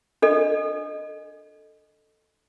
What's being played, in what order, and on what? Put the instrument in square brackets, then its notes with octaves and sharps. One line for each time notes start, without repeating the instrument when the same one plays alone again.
[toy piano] D4 A4 D#5